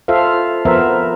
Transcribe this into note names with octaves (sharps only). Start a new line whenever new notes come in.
F4 A4 C5 E5 F5
F3 B3 A#4 C5 E5